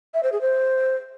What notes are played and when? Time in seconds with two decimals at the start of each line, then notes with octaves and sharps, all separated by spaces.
0.14 E5
0.23 C5
0.32 G#4
0.41 C5